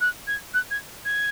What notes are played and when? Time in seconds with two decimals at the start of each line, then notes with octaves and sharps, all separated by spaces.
0.01 F#6
0.27 G#6
0.54 F#6
0.71 G#6
1.05 G#6